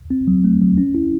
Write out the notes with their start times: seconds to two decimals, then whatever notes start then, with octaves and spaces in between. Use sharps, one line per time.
0.11 C4
0.28 F#3
0.44 A3
0.62 F#3
0.78 C#4
0.95 E4